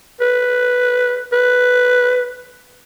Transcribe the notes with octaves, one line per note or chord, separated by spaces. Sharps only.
B4
B4